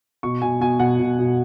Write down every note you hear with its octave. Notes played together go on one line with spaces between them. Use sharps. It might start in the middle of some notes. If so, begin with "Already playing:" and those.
B2 C#6
B2 G#5
B2 G#5
B2 F#5
B2
B2